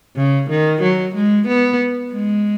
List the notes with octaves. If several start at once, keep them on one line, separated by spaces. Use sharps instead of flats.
C#3
D#3
F#3
G#3
B3
G#3